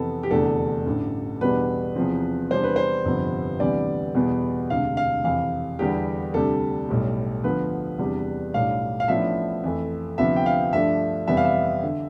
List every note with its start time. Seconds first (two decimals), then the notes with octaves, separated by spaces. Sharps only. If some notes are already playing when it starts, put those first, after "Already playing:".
Already playing: F2 C3 E3 B3 A4
0.23 G4
0.31 F1 E2 D3 A3 D4 A4
0.86 A1 G2 D3
1.41 E2 B2 G3 B3 D4 B4
1.96 E2 C3 F3 C4
2.50 E2 C3 G3 D4 C5
2.64 B4
2.76 C5
3.05 G1 F2 C3 F3 B3
3.59 D2 C3 E3 G3 B3 D5
4.15 E2 B2 G3 B3
4.70 E1 D2 C3 F5
4.97 F5
5.24 F2 C3 E3 F5
5.79 E2 D3 G3 B3 G4
6.34 D2 C3 G3 D4 A4
6.89 B1 A2 G3
7.44 D2 D3 F3 B3 B4
7.98 E2 C3 G3 D4
8.54 B1 A2 G3 D4 F5
9.00 F5
9.08 A1 A2 F3 B3 D4 E5
9.64 F2 E3 A3
10.18 D2 C3 F3 B3 E5
10.36 G5
10.46 F5
10.73 G2 F3 A3 D4 E5
11.27 F2 C3 E3 G3 B3 E5
11.37 F5
11.45 E5
11.84 D3